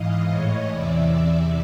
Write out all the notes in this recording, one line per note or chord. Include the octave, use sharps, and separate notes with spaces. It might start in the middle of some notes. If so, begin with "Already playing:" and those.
Already playing: G#2 E3 D#5 F5
A2 E3 C#5 D#5
E2 C3 E3 D5 E5
E2 C3 E3 D5 E5